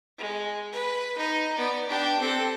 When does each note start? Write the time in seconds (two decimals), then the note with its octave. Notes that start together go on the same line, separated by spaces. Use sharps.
0.18 G#3
0.72 B4
1.17 D#4
1.57 B3 D5
1.87 D4 G4
2.20 C4 A4